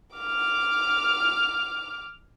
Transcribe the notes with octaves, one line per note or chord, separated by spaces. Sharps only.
D6 F6